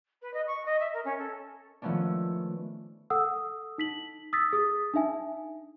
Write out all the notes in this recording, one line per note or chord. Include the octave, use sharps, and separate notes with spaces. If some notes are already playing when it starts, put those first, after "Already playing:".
B4
D#5
C#6
D#5
E5
A#4
C#4
A4
D#3 F3 A3 B3 C#4 D4
A4 F#5 D#6 E6
D#4 B6 F#7
D#6 E6 A6 B6
G#4 D#6
D4 D#4 E5 G#5